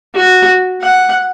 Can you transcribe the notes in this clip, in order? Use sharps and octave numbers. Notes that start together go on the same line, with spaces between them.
F#4
F#5